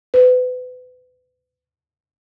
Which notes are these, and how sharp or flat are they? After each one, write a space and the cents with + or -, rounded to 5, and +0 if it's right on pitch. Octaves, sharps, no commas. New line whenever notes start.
B4 +30